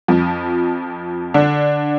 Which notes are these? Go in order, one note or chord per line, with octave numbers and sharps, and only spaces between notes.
F2 F3
D3 D4